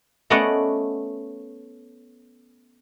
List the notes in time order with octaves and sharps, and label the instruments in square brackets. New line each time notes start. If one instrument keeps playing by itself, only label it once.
[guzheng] A3 B3 C#4 D5 D#5 F#5